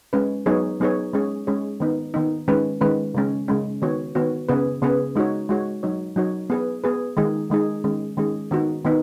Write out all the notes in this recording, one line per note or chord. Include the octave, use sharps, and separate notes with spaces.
G#3 C#4 B4
F#3 B3 D#4 G#4 C#5
F#3 B3 D#4 G#4 C#5
G#3 C#4 G#4 C#5
G#3 C#4 G#4 C#5
D#3 B3 D#4
D#3 B3 D#4
D#3 G#3 C#4 B4
D#3 G#3 C#4 B4
C#3 G#3 C#4
C#3 G#3 C#4
D#3 B3 F#4 C#5
D#3 B3 F#4 C#5
C#3 B3 G#4 B4
C#3 B3 G#4 B4
G#3 D#4 F#4 C#5
G#3 D#4 F#4 C#5
F#3 D#4 F#4 C#5
F#3 D#4 F#4 C#5
B3 G#4 B4
B3 G#4 B4
D#3 G#3 D#4 G#4
D#3 G#3 D#4 G#4
D#3 G#3 C#4 G#4
D#3 G#3 C#4 G#4
D#3 B3 D#4 F#4
D#3 B3 D#4